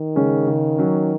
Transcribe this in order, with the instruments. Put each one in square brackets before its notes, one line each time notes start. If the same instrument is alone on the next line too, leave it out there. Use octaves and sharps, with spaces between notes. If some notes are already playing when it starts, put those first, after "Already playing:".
Already playing: [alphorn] D#3
[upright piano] C#3 G#3 C#4
C#3
F#3 C#4